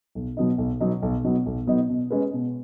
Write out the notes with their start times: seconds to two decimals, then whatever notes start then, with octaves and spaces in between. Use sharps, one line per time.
0.15 B1
0.37 B2 F#3 B3 D#4
0.58 B1
0.80 B2 F#3 B3 D#4
1.02 B1
1.24 B2 F#3 B3 D#4
1.46 B1
1.67 B2 F#3 B3 D#4
1.89 B2
2.10 G#3 C#4 G#4 B4
2.33 B2